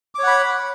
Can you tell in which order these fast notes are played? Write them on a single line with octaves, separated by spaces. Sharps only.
D6 C#5 F#5 B5